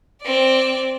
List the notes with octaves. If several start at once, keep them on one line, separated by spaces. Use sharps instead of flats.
C4 D5